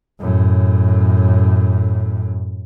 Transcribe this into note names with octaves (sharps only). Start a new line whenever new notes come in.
F#2 A2